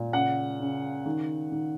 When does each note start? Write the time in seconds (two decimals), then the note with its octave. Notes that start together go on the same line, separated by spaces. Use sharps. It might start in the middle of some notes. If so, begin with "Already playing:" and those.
Already playing: A#2
0.13 C#3 F#5
0.60 C#3
1.06 D#3
1.52 D#3